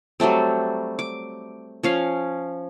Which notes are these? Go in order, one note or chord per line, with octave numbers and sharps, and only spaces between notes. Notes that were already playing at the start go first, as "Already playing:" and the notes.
F#3 G3 A3 C4
D6
F3 C#4 F5